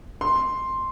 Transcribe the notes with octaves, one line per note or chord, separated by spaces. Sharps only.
C6